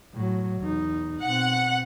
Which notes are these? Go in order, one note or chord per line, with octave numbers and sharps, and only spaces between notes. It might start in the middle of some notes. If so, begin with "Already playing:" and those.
A2 F#3
E2 D#4
B2 C4 F#5